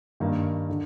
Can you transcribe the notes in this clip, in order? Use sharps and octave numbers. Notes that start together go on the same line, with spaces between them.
G2 D#3 A#3
D3